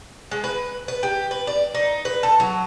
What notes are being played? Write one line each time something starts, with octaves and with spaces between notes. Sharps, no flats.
G#3
B4
B4
G4
B4
D5
D#4
B4
A4
F#3